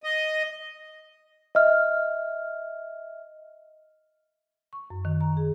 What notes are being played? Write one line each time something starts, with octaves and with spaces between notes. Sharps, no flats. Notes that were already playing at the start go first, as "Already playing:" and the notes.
D#5
D#5 E5 F6
C#6
F#2
D#3
A#5
G#4